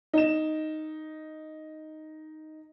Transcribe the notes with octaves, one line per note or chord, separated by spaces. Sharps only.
D#4 E7